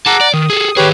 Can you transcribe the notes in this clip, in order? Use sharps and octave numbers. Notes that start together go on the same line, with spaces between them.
G#4 F#5 A5 A#5 D6
D5
D#3 D#6
G#4 A4
D#3 G4 G#4 B4 C#5